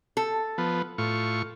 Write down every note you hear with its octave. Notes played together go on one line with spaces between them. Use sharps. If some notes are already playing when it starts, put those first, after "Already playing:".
A4
F3 B3
A2 F4 C#6